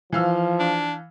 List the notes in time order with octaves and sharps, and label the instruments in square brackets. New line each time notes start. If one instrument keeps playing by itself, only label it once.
[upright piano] E3 F5 E6 [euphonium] F3
[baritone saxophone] D4